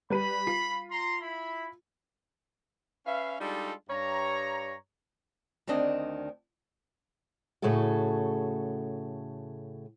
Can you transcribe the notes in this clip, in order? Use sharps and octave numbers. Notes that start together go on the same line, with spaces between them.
G3 B4 B5 D#7
F4 C7
A#5 C6
E4 B5
C#4 B4 E5 F5
G3 G#3 D4 D#4 F4 A4
G2 C#5 A#5
D2 D#3 C4 D4 D#5
A2 C#3 F#4 G#4 A4